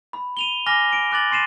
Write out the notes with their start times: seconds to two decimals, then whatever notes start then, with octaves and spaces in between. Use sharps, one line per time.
0.13 B5
0.37 D#7 F7 G7
0.66 G#5 D6 F6 A#6 G7
0.93 D7
1.11 D6 F#6 A6 F#7
1.31 C6 A6 C7 D#7 E7